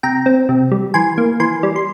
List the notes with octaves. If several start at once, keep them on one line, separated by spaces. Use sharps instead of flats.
C3 G5 A#5
C4
C3
G3
E3 G#5 C6
A#3
E3 G#5 C6
G3
C6